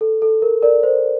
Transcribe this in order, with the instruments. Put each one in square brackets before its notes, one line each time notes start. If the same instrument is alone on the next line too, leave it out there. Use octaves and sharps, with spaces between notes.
[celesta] A4
A4
A#4
A#4 D5
C5